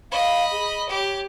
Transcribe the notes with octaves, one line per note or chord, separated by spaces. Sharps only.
D#5 F5 B5
G#4
G4 C#5